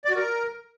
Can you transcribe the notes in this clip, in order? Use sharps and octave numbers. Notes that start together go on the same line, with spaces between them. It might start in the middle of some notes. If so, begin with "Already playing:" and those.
D5
F#4
A#4